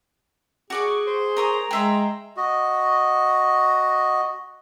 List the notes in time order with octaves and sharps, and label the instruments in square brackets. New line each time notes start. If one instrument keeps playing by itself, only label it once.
[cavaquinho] F#4 D5 D6 [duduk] G#4 [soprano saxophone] C#6
[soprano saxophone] C5
[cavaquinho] A#4 C#5 D#6 [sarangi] A#5
[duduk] G#3 [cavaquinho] G#4 E5 C6 [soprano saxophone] G5
[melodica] F#4 D#5